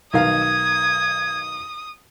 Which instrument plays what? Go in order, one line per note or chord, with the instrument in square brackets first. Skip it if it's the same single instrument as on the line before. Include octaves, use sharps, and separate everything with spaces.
[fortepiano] B1 D#3 F5 [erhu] D#6 [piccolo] G#6